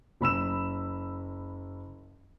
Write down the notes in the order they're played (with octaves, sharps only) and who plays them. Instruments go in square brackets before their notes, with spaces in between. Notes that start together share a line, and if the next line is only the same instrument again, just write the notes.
[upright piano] F#1 B5 E6 E7